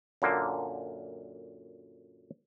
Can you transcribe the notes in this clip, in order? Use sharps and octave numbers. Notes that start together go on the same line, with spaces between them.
F#2 A#2 D3 A#3